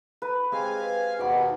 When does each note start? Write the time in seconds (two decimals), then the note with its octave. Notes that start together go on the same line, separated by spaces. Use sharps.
0.22 B4 A#5
0.52 G#3 C4 G4 F5 G#5
0.80 B4
1.19 D#2 B2 D#3 F#4 B4 D5 F#5 B5